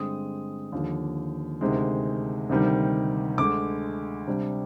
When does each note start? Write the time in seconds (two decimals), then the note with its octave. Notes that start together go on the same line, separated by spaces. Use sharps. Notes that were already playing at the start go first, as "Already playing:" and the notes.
Already playing: G2 D3 G#3 C4 D#6
0.72 D#2 D3 F3
1.61 D2 C3 D#3 G#3
2.49 D2 C3 D#3 G3
3.38 D2 D3 G#3 D6
4.27 C3 G3 D4